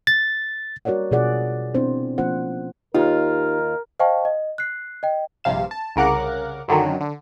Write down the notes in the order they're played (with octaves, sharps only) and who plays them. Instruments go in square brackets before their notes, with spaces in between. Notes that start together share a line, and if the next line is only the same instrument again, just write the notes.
[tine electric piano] A6
[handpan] G3 F#4 A#4 C#5 D5 F#5
B2 F4 G#4 D5 F#5
B3 C4 D4 E4 C5
F3 A#3 C#4 F4 C5 F#5
[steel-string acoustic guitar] D#2 F4 [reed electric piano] D#4 G4 [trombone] A#4
[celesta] C5 D#5 F5 G5 A5 C#6
D#5
F#6 C7
D#5 G5
[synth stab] A#1 G2 C3 F5 E7
A5
C2 C#3 A#4 F#5 D6 F#6
F#2 D3 D#3 F#3
D3